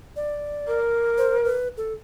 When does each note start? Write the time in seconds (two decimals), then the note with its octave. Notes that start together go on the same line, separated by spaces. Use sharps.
0.16 D5
0.67 A#4
1.18 C5
1.45 B4
1.77 A4